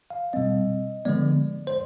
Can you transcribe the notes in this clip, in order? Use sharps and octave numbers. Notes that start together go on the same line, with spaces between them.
F5
B2 G3 C4 D#5
D3 F3 G#3 B3 D5
C5